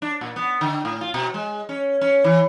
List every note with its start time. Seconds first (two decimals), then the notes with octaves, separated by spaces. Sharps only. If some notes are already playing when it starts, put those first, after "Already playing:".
0.02 D4
0.21 A#2
0.36 B3
0.61 D3
0.85 A2
1.01 F4
1.14 B2
1.34 G#3
1.69 C#4
2.01 C#4
2.24 E3